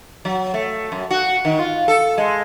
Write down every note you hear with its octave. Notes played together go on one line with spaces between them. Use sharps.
F#3
A3
F#2
F#4
D#3
F4
A4
G#3